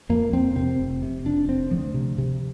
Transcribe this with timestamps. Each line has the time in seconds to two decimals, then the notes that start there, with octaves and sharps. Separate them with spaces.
0.09 F2 A#3
0.33 F2 C4
0.56 C3 C4
0.79 F1
1.03 C3
1.25 F1 D4
1.48 F1 C4
1.71 D2 F3
1.94 C3
2.18 C3